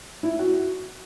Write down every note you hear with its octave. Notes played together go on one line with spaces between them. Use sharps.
E4
F#4